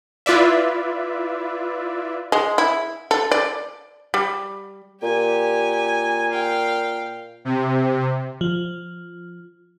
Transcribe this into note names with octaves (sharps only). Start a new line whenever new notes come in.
E4 F4 B4 D5 E5
G#3
E4
A4
D5
G3
A#2 G4 G#5
F5 G5
C3
F3